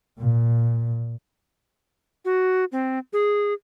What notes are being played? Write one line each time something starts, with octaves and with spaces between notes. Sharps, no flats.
A#2
F#4
C4
G#4